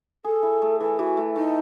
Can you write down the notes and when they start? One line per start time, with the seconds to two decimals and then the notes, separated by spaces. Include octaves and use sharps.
0.24 G#4 A4
0.43 E4
0.62 A3
0.80 E3 A4
0.99 E3 F#4
1.17 A3
1.35 A3 D#4